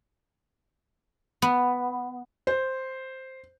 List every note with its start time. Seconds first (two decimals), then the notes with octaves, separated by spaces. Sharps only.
1.42 B3
2.47 C5